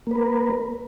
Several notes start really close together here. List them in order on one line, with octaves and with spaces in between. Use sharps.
A#3 B4 A#4